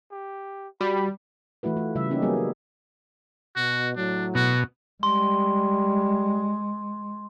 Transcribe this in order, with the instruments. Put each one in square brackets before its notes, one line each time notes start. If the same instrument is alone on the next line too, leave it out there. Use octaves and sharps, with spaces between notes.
[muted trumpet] G4
[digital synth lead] G3 [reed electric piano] F#4 [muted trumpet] B5
[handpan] E3 A3 E4 F#4 B4
A3 F4
C#3 G3 E5
A#3 C#4 D#4 G4
F#3 G3 A#3 B3 G#4
F#3
[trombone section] B2 [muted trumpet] F#4
[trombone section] A2 F#3 [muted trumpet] D4
[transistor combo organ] B2 [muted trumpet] F#4
[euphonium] G3 [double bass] G#3 [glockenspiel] C6